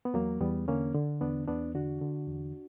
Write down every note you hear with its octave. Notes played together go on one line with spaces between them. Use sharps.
B3
E2 F#3 A#3
E2 G3 B3
D3 A#3 C#4
D3
E2 B3 D4
E2 B3 D4
D3 D4 F#4
D3
E2